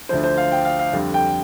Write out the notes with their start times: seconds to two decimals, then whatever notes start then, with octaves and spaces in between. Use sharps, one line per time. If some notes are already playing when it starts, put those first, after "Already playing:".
0.09 D2 D3 F3 C5
0.24 C5
0.38 F5
0.52 G5
0.65 F5
0.79 F5
0.93 F2 D3 G3
1.14 G5